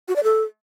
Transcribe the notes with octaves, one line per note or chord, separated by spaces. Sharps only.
F#4
D5
A4